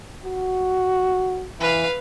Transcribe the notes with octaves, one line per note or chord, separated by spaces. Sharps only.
F#4
E3 B4 F5